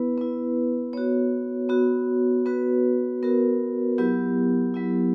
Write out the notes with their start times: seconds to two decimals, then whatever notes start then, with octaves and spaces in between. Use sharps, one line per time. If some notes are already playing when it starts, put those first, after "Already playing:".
Already playing: B3 E4 B4
0.18 B3 E4 B4
0.93 B3 F#4 C#5
1.69 B3 F#4
2.46 B3 F#4 B4
3.23 B3 F#4 A#4
3.98 F#3 B3 E4 G4
4.74 F#3 B3 E4